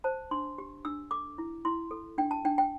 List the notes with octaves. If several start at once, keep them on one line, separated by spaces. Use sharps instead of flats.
C5 A5
D4 C6
G4
D4 E6
A4 D6
E4
E4 C6
A4
D4 G5
A5
D4 G5
G5